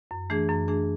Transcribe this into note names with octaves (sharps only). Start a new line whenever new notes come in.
F#2
E3 A3 D4 G#4
F#2
E3 A3 D4 G#4